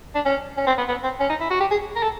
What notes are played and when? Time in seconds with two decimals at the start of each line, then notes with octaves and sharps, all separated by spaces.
0.15 D4
0.25 C#4
0.57 C#4
0.67 C4
0.78 B3
0.88 B3
1.03 C4
1.20 C#4
1.29 D#4
1.40 E4
1.50 F#4
1.60 G4
1.71 G#4
1.96 A#4
2.03 A4